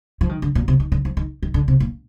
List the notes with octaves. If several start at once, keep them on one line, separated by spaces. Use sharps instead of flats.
F3
D#3
D3
A#2
C3
D#3
D3
F3
D#3
D#3
D3
C3
A#2